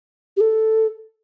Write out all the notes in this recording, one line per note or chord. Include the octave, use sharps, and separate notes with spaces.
G4
A4